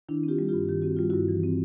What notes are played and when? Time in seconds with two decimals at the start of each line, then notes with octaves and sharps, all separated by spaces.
0.09 D#3 D4 E4
0.23 C4 F4 G4
0.39 G3
0.48 F4 G4
0.54 G2
0.69 D#3 G4
0.82 C4 F#4
0.96 G3 F4
1.10 G2 E4 F#4
1.29 E3
1.43 C4